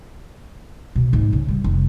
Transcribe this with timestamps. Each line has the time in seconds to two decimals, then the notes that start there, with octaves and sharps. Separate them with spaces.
0.96 B2
1.13 G#2
1.33 C#3
1.48 G3
1.64 F1